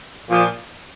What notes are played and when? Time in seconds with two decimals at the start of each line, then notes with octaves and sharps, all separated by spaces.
0.28 A#2 F3